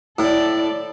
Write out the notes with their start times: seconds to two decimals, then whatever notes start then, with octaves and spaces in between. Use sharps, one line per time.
0.19 A2 A4 D5